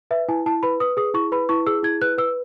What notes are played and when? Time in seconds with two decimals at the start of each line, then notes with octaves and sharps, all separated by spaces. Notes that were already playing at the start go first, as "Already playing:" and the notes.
0.11 B4 E5
0.29 E4 G#5
0.46 E4 A5
0.63 B4 B5
0.80 B4 D#6
0.97 G#4 D#6
1.14 E4 C#6
1.32 B4 B5
1.49 E4 C#6
1.67 G#4 E6
1.83 E4 G#6
2.02 B4 F#6
2.18 B4 E6